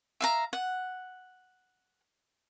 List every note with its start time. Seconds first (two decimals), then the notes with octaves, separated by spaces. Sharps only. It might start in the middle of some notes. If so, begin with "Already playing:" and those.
0.21 E5 F5 A#5
0.53 F#5